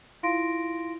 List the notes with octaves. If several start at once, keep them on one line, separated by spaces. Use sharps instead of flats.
E4 F4 F5 C6 A#6 D7